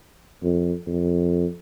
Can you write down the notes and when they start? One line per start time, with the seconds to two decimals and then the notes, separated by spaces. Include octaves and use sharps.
0.43 F2
0.87 F2